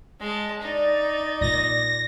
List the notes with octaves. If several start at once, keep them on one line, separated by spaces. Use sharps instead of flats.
G#3 A5
D#4 D5
A#2 A#6